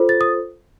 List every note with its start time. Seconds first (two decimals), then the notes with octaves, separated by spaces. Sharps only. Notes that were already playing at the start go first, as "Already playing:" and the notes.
Already playing: F4 A4 C5
0.09 A6
0.21 D#6